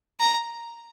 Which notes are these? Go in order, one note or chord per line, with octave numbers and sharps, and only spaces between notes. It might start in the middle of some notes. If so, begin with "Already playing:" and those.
A#5